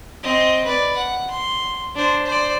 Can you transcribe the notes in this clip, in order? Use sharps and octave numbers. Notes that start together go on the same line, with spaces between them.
C4 D#5
B4 D5
F#5
C6
D4 C5
C5 D5